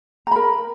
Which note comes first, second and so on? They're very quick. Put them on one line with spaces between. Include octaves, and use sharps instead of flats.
A#5 B5 A#4